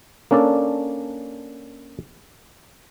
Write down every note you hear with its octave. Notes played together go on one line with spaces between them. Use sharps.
A#3 C#4 D4 A4 D5